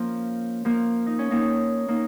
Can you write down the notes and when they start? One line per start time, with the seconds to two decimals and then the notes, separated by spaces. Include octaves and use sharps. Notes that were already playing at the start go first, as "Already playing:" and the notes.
Already playing: F3 A#3 C#4
0.65 F3 A#3
1.06 D#4
1.19 C#4
1.31 A#3 D#4
1.88 A#3 D#4